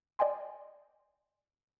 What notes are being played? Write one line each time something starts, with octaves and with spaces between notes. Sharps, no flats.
D5 D#5 G5 G#5 C6